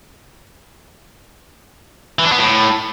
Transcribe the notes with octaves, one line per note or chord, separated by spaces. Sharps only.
E3
D4
B3
A2